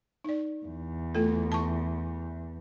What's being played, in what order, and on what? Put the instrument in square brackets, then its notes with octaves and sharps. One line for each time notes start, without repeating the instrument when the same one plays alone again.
[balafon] D#4 D5
[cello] E2
[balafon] A3 F4 A4
A5 C#6